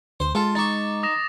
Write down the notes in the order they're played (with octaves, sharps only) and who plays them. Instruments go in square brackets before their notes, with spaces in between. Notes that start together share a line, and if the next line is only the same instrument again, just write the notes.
[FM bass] D2 [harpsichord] C5
[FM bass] G#3 [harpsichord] F4 A4
[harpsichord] D#4 C#6 [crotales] D6 A6
[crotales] D#6 A#6 E7